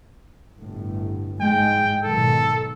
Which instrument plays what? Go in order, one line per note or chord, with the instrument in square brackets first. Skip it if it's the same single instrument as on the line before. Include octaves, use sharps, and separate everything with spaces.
[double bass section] G1 A2
[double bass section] G#2 G#3 [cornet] G5
[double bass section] B1 G#2 D#3 [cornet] A4